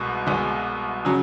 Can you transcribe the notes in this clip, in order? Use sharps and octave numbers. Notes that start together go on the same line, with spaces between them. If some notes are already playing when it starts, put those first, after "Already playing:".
Already playing: C2 B2 G#3
C2 B2 G#3
C#3 F#3